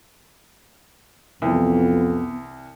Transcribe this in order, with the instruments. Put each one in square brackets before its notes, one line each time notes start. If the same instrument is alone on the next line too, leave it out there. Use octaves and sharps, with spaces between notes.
[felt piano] C2 E3 [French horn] F2 [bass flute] B3